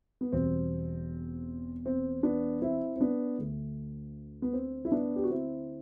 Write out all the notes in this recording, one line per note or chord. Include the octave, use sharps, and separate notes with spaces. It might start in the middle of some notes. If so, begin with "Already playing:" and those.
B3
E1 E2 B2 G3 C4
C4
B3 D4
C4 E4
C4
B3 D4
D2 D3 A3
B3
C4
E4
B3 D4
G4
F#4
C4 E4